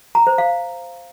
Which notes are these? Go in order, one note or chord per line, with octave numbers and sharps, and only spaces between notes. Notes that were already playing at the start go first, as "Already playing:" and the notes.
A#5
C5
F5